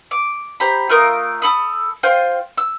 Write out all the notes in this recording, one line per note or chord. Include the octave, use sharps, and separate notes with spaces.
D6
G4 C5 A#5 B5
A3 F4 A#4 D#6
A4 B5 D#6
F4 C5 G5 G6
E6